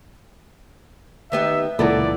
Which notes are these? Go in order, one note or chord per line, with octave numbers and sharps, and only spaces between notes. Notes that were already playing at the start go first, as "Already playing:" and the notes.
D#3 B3 G4 E5
C#2 A#2 E3 B3 A4 A#4 D5